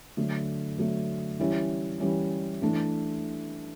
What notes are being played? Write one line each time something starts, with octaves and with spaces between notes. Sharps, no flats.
D3 F#3 A3
D3 F#3 A3
E3 G3 C#4 E4
E3 G3 C#4 E4
E3 A3 D4